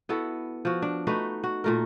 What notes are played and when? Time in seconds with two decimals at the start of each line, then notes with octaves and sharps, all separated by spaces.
0.09 B3 E4 F#4 A4
0.65 F3 F#4
0.82 D4
1.07 A3 D#4 F#4 B4
1.44 F#4
1.64 A#2 A3 A#4